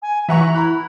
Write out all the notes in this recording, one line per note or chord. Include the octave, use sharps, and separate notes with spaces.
G#5
E3 E5 F#5 A#5 C#6
E4 A#5 B5 F#6